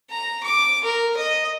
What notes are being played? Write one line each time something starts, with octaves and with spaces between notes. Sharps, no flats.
A#5
D6
A#4
D#5